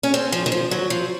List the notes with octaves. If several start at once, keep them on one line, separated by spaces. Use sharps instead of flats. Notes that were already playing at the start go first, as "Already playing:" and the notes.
C#4
C4
F3
D#3
F3
F#3
F3